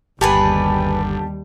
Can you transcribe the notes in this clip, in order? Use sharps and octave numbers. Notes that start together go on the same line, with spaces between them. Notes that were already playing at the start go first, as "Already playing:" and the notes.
G1 D#2 G3 B3 G4 G#4 B4 A5